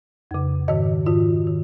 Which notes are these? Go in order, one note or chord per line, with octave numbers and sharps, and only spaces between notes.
F2 C#3
G#2 D#3 D#5
G#2 D#3 F4
D#3